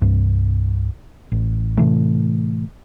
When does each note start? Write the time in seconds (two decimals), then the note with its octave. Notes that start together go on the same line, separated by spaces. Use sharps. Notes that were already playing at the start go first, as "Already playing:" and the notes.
0.02 C2 G2
1.32 A1
1.77 A2 C3 E3 A3